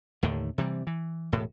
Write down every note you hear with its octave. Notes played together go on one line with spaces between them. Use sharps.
D#2 A2 D3 D#3
C3 E3 G3
E3
E1 A2